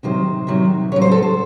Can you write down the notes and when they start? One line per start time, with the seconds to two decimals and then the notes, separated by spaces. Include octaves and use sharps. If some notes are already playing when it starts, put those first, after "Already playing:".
0.03 C3 D#3 F#3 C5
0.47 C3 D#3 F#3
0.92 C#3 F#3 C#5
1.01 C5
1.11 A4
1.22 C5